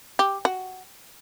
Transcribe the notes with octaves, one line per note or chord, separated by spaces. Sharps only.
G4
F#4